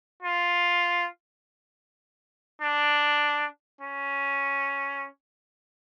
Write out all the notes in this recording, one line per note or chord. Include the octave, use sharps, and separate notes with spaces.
F4
D4
C#4